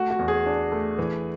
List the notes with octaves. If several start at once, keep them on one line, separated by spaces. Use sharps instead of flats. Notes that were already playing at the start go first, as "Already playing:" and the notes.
Already playing: A3 F#4
F#4
E2
G#4
D4
A3
E3